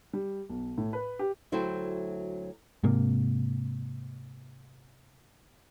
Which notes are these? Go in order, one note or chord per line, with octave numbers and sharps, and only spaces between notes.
G3
B1
A2
B4
G4
D2 F#3 A3 E4 C5 G5
G#2 C3 A#3